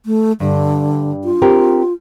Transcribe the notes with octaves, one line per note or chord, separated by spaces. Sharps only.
A3
G2 D3
F4
C4 G4 A#4